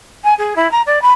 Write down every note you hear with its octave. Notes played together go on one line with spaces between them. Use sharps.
G#5
G#4
E4
A#5
D5
B5